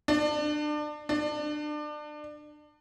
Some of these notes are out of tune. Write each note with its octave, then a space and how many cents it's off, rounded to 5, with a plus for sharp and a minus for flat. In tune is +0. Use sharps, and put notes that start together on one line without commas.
D4 +30
D4 +30